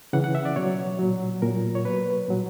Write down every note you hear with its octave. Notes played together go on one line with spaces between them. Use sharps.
C#3 E3 F#5
F#5
E5
D5
B2 F#3 C#5
A#2 F#3
A#2 F#3 A#4
C#5
B2 F#3 B4
A#2 F#3